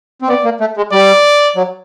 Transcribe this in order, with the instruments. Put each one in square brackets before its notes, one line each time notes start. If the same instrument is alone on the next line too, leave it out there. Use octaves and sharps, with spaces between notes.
[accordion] C4
[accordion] B3 [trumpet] D5
[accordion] A#3
A3
G#3
[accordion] G3 [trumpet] D5
[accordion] F#3